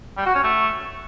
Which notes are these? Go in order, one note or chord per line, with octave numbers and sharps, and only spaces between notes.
G3
F#4
C#4
A3